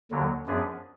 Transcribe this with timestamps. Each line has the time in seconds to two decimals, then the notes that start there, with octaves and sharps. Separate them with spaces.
0.11 D#2 D3 F#3
0.46 F#2 F3 B3 D4 G#4